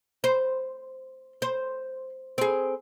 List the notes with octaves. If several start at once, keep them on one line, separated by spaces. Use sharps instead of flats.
C5
C5
C4 G#4